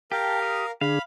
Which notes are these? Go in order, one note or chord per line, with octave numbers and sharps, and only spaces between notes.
G4 A#4 F5 G5 A5
D#6
D3 D4 G#4 F5 B5